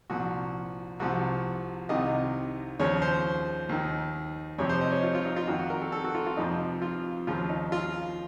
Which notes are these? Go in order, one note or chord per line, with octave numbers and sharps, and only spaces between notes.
C2 A#2 F3 F#4
C2 C3 F3 F#4
C2 C3 D#3 D#5
D#2 C#3 F3 C#5
C5
D#2 D#3
F2 C3 F3 C#5
C5
D#5
C#5
F4
F4
D#4
F4
F2 D#3 F#4
F#4
A#4
A4
A4
F#4
F4
F4
F2 C3 F3 D#4
F4
D#2 C#3 F3 F4
D#4
F4